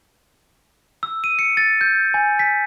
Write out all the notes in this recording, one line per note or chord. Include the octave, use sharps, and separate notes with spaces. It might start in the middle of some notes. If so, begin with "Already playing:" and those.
E6
D#7
C#7
A6
G6
G#5
B6